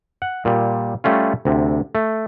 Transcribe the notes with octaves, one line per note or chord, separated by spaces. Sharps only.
F#5
A#2 G3
G3 A3 C#4 F4
D2 C3
A3